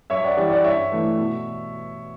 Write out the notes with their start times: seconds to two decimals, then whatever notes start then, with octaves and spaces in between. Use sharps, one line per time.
0.10 F#2 C#5 E5
0.24 D5 F#5
0.37 E3 G3 D5 F#5
0.51 D5 F#5
0.64 G2 C#5 E5
0.92 E3 A3
1.18 B2